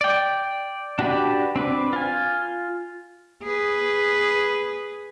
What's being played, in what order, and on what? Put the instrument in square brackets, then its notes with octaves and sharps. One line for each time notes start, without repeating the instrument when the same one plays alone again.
[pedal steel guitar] D5 G5
D4 F#4 G4 B4 D5
C4 D4 B4
F4 G#5
[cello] G#4 B4